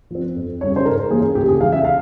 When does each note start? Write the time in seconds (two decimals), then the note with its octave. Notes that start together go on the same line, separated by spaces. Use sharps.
0.11 F3 C4
0.36 F2
0.61 C#3 G3 C#5
0.76 C5
0.85 G#2 A#4
1.11 E3 A#3 C#4 G#4
1.35 C#2 G4
1.48 G#4
1.60 C#3 E3 F5
1.72 E5
1.85 F5